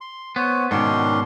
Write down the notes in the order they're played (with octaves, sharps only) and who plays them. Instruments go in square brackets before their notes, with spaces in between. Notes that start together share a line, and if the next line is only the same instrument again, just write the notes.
[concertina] C6
[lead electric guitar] B3 [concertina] C5 C#5
[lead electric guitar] G#2 B2 [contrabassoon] D#3 [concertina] C#4 D4 C6